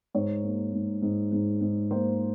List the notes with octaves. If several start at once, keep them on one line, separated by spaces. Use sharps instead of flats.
G#2 C#5
A#3
G#2
G#2
G#2
G#2
A#3 C5